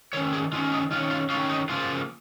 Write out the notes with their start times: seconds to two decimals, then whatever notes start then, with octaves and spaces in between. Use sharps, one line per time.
0.13 D#3 C#4 C#5
0.33 G#4
0.52 D#3 F4
0.56 C#4
0.72 D#4
0.91 D#3 F4
0.95 C#4
1.10 F4
1.30 C#4 F4
1.34 D#3
1.49 D#4
1.69 C#3 F3 A#3 F4